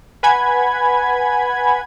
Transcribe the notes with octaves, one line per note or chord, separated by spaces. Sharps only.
B4 F#5 G#5 B5 G#6